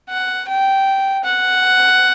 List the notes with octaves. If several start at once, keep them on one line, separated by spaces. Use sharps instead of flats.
F#5
G5
F#5